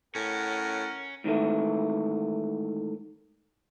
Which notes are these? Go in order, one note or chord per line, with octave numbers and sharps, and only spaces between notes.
A2 C#4 A#4 F#5
G#2 D#3 E3 A3